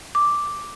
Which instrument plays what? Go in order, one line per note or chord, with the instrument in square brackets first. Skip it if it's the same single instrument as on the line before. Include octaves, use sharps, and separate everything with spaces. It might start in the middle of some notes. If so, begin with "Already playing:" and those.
[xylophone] D6